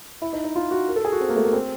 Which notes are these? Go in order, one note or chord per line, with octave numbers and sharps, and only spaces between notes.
E4
D#4
D#4
F4
F#4
A#4
A4
G#4
F#4
C4
A#3
A3
A#3
C4